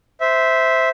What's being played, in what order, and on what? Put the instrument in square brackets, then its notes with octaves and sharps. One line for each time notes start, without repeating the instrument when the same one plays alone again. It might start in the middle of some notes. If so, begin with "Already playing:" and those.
[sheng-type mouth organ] C5 E5